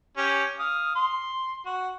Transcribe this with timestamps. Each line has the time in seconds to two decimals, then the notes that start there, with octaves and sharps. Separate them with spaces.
0.17 C#4 G4
0.59 F5 D#6
0.95 C6
1.66 F#4